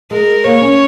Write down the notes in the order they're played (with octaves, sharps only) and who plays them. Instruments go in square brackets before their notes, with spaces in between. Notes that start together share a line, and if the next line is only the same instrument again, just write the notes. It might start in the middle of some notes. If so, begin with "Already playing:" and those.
[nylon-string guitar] G#3 [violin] A#4
[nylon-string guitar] A#3 [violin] C#5
[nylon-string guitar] C#4